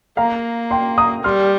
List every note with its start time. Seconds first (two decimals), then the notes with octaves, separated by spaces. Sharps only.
0.17 A#3 F5 A#5
0.71 G5 C6
0.98 A#5 D#6
1.24 G3 C6 F6